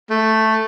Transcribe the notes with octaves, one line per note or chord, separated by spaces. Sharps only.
A3